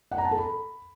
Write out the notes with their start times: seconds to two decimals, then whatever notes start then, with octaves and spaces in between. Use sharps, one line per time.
0.11 F#5
0.18 A#5
0.25 A5
0.31 A4
0.38 B5